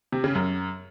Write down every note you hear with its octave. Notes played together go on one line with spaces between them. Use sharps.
C3
C#3
F#2